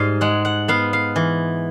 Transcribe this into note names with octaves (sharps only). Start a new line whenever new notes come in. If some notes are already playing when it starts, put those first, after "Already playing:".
Already playing: G#2 G3 D#5 F5
G#3 F#5
F#5
B3 F5
F5
E3